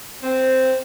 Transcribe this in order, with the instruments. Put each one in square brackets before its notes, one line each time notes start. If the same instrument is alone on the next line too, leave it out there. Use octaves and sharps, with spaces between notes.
[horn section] C4